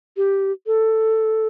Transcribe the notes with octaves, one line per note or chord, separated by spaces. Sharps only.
G4
A4